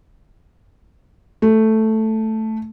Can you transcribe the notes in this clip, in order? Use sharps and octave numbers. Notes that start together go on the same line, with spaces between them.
A3